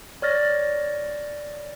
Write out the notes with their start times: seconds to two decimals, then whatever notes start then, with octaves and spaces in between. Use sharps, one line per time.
0.22 C#5 D5 F6 A6 A#6